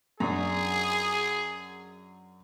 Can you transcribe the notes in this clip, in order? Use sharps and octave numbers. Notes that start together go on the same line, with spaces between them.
F#2 D4 G#4